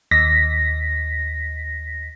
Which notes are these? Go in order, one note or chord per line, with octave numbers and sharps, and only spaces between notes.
D#2 A#6 B6